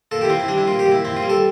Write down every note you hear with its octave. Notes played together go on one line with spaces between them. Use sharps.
A#2 A4
G4
E4
C4 F4
E4
G3 D4
E4
A#2 F4
G4
A#2
E4
C4 E4
F4
G3
A4